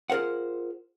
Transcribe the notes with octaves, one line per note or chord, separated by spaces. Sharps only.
F4 G#4 A#4 C5 F#5